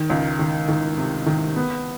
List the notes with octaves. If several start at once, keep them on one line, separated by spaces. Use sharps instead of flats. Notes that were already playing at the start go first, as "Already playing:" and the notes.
Already playing: D#3
C#2
D#3
D#3
C3
D#3
B3